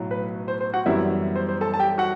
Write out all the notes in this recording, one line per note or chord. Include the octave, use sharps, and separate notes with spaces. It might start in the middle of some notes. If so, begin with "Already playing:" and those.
Already playing: B1 A2 F#3
B4
C5
C5
F#4 F#5
F#2 E3 G3 B3 E4 E5
C5
C5
A4 A5
A5
G4 G5
F#4 F#5